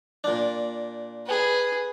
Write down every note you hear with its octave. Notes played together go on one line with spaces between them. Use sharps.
A#2 D4
G#4 B4